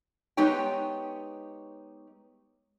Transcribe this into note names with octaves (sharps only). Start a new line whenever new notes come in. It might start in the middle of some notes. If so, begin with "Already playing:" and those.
G#3 B3 D#4 G4 C#5 G5